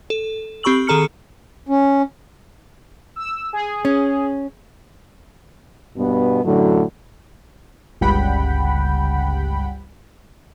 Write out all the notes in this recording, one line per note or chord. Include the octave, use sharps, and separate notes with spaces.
A4
C4 G4 B5 C#6 E6 F#7
D#3 G#4 A4 A#5 F6 C#7
C#4
E6
G#4
C#4
G2 B2 B3
F#2 A2 D3 F#3
G1 C#2 G3 F#5 G5 B5